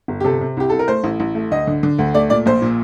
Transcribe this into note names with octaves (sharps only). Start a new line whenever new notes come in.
G1
G4
C3 A4
C3
C2 G4
C2 A4
A#4
A3 C5
A1
A1
A3
D2 D#5
D3
D3
D2
A3 D5
A#2 D5
A#1 C5
A#2